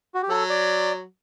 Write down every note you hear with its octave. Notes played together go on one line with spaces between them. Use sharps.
F#4
G4
F#3 A4
D5